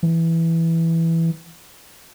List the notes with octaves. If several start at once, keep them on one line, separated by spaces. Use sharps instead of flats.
E3